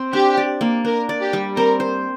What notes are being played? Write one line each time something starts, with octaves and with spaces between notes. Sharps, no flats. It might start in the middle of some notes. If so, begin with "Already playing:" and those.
Already playing: C4
D4 G4
D5
A#3
D4 A#4
D5
G4
G3
C4 A#4
C5